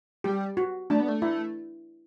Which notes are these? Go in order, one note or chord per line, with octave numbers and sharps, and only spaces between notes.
G3 G4
F#4
A3 D4
B3
A3
E4